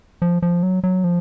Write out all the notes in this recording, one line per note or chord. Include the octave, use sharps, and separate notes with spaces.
F3
F3
F#3
F#3
F3